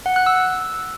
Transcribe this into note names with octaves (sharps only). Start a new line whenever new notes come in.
F#5
F#6
E6